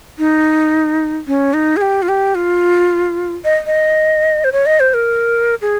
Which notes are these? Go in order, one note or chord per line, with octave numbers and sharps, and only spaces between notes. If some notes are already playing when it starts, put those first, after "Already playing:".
D#4
C#4
D#4
G#4
G4
F4
G4
F4
D#5
D#5
C5
C#5
D#5
C5
A#4
G#4